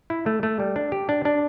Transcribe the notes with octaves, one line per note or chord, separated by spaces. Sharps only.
E4
A3
A3
G3
D4
G4
D4
D4